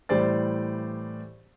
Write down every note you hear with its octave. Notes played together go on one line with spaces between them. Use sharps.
A2 E3 G3 C5 D5 A6